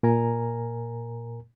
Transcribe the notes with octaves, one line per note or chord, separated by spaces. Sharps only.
A#2 A#4 G#5 A#5